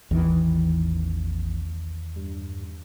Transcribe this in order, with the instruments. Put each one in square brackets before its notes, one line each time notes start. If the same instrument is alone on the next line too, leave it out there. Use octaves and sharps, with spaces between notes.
[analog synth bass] A1 [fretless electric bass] E2 D#3 E3
[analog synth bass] G2